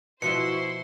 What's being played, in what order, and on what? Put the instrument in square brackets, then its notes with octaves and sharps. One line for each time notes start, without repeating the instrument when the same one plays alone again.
[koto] B2 F3 E5 [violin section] E4 C5 C6 [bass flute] F#4 [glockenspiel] C#7